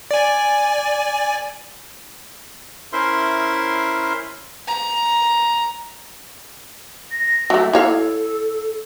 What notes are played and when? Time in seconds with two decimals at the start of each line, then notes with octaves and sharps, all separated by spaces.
0.11 D5 G#5
2.93 C#4 E4 A#4 C5 E5 C6
4.67 A#5
7.11 A#6
7.50 F#3 A3 E5
7.73 E4 A4 C#5 F5